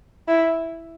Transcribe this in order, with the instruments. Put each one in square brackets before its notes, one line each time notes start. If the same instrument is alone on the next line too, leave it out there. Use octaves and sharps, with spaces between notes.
[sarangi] E4